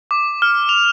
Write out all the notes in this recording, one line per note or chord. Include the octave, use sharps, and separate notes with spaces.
D6
F6
F7